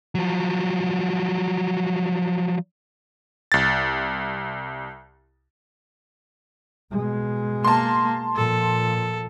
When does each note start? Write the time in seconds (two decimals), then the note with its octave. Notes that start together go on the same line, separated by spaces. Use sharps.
0.15 F3 F#3
3.52 C2 A6
6.92 B2 G#3
7.64 A#3 A5 C6
8.36 A#2 F3 A4